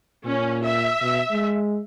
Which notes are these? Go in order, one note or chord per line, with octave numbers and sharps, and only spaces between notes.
A#2 C#4
E5
B2
G#3